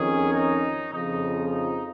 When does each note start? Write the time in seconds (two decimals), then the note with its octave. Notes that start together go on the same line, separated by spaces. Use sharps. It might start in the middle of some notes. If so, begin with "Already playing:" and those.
Already playing: F2 D#3 C#4 G#4
0.33 D#4
0.92 F2 C#3 F3 D#4
1.52 D#4